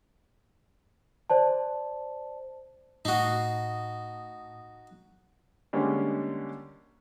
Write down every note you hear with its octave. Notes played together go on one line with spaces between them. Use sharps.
C5 D5 A5
A2 D#4 F#4 D#6
D3 G3 G#3 A#3 C#4